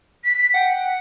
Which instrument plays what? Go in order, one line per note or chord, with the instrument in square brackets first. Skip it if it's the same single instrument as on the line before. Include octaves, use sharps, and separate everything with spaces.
[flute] B6
[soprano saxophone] F#5 [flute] G5